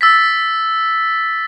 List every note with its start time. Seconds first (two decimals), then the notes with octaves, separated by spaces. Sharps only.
0.01 E6 A6 B6